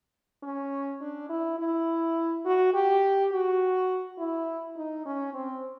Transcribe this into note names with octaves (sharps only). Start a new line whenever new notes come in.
C#4
D4
E4
E4
F#4
G4
F#4
E4
D#4
C#4
C4